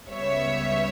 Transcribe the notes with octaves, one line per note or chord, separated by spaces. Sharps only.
C#2 C#3 G3 B3 C#5 E5